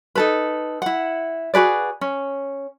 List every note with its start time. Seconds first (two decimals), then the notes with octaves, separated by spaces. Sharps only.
0.15 D#4 A4 B4
0.82 E4 F#5
1.54 F#4 G#4 B4 D5
2.01 C#4